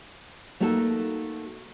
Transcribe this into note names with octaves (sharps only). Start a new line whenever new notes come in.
A3 A#3 D#4 F#4 A4